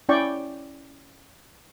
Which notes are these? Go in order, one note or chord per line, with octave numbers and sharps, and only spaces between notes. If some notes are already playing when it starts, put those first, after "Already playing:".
C#4 E4 D5 G5 C#6